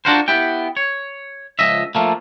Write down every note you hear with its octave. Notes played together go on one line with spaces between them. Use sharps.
D4 D#4 F4 F#4 A#4 C5
B3 E4 G4 G5
C#5
C#2 F3 D#5 E5
F3 A3 A#3